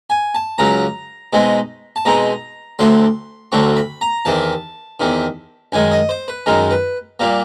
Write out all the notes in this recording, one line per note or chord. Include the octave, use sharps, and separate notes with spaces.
G#5
A5
C#2 C#3 F#3 A#5
B2 G#3 C4 D#4
A5
B2 G#3 C4 D#4 A#5
D2 D3 F#3 A3 C4 C6
D2 D3 F#3 A3 C4 C#6
B5
A#5
E2 C3 D#3 A5
E2 C3 D#3
F#2 D#3 G#3 G#5
D#5
C5
B4
F#2 D#3 G#3 A#4
B4
A#2 G3 A#3